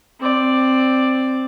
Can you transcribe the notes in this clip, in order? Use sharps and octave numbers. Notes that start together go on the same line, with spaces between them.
C4 D5